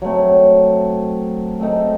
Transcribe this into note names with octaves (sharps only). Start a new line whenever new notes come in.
F#3 A3 C4
A3 C4 D#4 A4